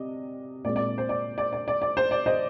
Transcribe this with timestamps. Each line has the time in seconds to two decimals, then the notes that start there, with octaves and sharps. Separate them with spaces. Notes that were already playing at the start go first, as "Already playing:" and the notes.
Already playing: C3 D5 D#5
0.64 A#2 G#3 C4 D5
0.76 D5
0.98 C5
1.09 D5
1.38 D5
1.53 D5
1.68 D5
1.82 D5
1.97 C5
2.11 D5
2.26 C5 D#5